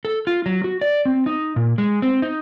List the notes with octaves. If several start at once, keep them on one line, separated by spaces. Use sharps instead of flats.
A4
F4
F#3
F#4
D5
C4
D#4
A#2
G#3
C4
D#4